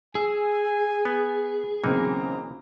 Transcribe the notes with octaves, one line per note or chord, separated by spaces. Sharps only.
G#4 G#5 E6
B3
B1 C#3 E3 A#3 C4 D#4 A#5